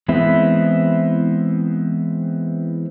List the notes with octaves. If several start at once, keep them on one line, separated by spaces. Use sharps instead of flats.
E3 G#3 B3 C4 E4